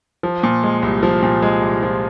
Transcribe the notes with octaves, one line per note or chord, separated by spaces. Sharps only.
F3
A#2
G#3
C2
F3
A#2
G#3
C2
F3